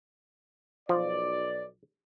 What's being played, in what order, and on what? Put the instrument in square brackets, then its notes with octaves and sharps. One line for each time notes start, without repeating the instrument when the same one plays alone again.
[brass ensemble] B1 D5 [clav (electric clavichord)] F3